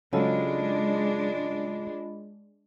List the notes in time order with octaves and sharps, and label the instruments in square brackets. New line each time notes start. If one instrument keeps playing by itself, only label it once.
[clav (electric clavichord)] C#3 F#3 A4 [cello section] G#3 D4 [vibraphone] F4 D#5 B5